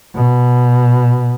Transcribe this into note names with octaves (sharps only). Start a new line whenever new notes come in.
B2